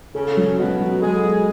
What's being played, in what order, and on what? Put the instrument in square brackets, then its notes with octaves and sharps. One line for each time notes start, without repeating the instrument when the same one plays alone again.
[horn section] C#3 C#4 [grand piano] A4
[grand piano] F#3
[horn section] B2 B3 [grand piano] F#4
[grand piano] F#3
[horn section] G#3 G#4 [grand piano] A4
[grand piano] F#4